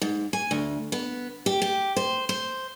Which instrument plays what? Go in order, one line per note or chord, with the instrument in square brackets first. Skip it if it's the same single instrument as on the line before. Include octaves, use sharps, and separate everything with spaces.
[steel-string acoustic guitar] G#2
G#5
D2
B3
G4
G4
C5
C5